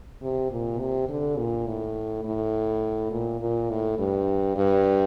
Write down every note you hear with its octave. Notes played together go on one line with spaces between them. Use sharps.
C3
A#2
C3
D3
A#2
A2
A2
A#2
A#2
A2
G2
G2